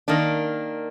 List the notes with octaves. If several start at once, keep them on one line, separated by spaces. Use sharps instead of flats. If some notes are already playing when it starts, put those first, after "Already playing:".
D#3 A#3 D4